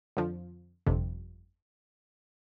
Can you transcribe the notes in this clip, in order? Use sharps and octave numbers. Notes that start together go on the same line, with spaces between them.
F2 D3 F3
G1 F2 C3